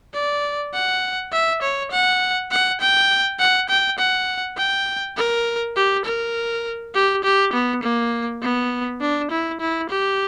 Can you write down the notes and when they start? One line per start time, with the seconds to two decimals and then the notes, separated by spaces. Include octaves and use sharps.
0.14 D5
0.74 F#5
1.32 E5
1.62 C#5
1.92 F#5
2.51 F#5
2.81 G5
3.39 F#5
3.69 G5
3.99 F#5
4.58 G5
5.17 A#4
5.76 G4
6.05 A#4
6.95 G4
7.24 G4
7.53 B3
7.83 A#3
8.42 B3
9.01 D4
9.31 E4
9.60 E4
9.90 G4